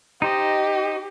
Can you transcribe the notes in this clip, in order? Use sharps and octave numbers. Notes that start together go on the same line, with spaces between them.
D#4 G4 C5 D#5